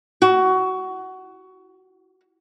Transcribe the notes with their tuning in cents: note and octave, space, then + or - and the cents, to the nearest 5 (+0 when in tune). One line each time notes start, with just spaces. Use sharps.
F#4 +15